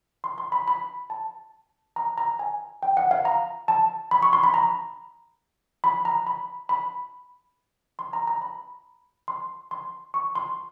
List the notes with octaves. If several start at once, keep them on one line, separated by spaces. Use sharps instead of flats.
C6
C6
B5
B5
A5
A#5
A#5
G#5
G5
F#5
F5
A#5
A5
B5
C#6
C6
B5
A#5
B5
A#5
B5
B5
C6
A#5
A#5
B5
C6
C6
C#6
C6